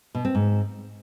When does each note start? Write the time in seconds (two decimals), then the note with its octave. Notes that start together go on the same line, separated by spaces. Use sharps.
0.15 B2
0.25 C4
0.35 G#2